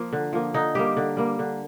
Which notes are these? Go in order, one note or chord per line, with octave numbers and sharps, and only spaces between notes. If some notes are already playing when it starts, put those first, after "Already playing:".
Already playing: F3 A#3
D3
F3 A#3
D3 D#4
G3 A#3 G4
D3
G3 A#3
D3